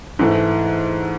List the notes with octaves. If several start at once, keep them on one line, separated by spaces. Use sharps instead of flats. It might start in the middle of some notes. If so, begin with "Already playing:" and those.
G#2 E3 A3